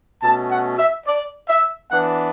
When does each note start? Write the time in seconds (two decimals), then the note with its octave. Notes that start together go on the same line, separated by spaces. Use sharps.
0.22 B2 A3 C#4 A5
0.51 F#5
0.78 E5
1.07 D5
1.49 E5
1.91 E3 B3 D4 F#5